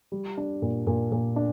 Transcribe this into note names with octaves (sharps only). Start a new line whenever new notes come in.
G3
D4
A#2
A#2
A#2
D4